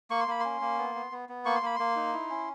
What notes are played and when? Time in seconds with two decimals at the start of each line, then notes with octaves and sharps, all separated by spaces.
0.11 A#3 C#6
0.20 C6
0.28 A#3 B5
0.40 C#4 C6
0.61 A#3
0.78 B3
0.95 B3
1.12 B3
1.29 B3
1.46 A#3 C#6
1.56 C6
1.62 A#3 B5
1.76 A#3 C6
1.96 D#4
2.13 E4
2.30 C#4